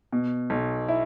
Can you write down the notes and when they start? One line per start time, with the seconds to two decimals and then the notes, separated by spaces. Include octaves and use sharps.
0.12 B2
0.50 B1
0.88 E4